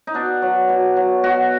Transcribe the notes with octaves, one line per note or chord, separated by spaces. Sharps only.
D#4
B2 D4
F#3
B2
F#3
B2 F#4